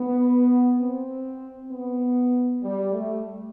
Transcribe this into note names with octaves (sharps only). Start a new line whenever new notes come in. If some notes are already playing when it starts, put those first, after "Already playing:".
Already playing: B3
C4
B3
G3
A3